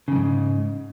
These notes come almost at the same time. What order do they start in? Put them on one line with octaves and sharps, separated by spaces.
C#3 F2 G#2